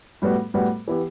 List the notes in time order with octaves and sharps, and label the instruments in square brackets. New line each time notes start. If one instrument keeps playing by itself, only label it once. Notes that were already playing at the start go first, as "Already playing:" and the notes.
[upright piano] A2 G3 B3 F#4
A2 G3 B3 F#4
E3 B3 E4 G4